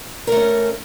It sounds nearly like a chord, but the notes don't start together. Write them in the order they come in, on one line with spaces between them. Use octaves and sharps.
A#4 A3 C#4